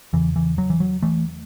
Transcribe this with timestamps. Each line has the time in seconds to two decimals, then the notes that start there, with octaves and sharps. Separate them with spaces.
0.13 E2 C#3 E3
0.36 E3
0.58 F#3
0.70 E3
0.80 F#3
1.02 E3 A3